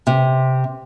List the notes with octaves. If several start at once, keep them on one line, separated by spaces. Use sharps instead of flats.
C3